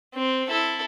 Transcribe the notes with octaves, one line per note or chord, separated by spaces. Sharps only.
C4
E4 A4